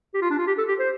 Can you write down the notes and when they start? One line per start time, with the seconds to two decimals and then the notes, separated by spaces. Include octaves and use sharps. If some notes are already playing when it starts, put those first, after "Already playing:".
0.14 G4
0.22 F4
0.31 D4
0.38 F4
0.47 G4
0.58 A4
0.68 G4
0.79 C5